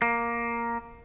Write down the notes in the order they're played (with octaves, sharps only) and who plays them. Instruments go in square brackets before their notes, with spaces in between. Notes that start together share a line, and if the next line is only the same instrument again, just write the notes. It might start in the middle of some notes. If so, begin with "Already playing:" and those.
[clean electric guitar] A#3